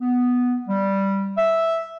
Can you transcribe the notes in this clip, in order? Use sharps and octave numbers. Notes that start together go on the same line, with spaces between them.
B3
G3
E5